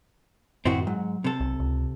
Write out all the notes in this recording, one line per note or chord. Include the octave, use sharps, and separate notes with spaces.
F#2 A2 D#3 C4 E4 F#4
G#2 F#3
C3 A4
B1
C#2